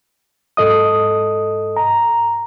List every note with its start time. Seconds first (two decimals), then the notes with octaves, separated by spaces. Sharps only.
0.57 G#2 A4 D#5 D#6
1.77 A#5